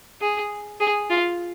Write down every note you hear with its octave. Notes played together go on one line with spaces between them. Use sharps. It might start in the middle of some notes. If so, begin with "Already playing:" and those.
G#4
G#4
F4